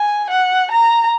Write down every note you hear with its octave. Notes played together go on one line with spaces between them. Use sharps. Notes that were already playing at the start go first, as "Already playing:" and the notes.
Already playing: G#5
F#5
A#5